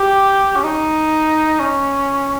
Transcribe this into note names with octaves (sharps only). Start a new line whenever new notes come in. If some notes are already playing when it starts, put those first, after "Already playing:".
Already playing: G4
C#4
D#4
C#4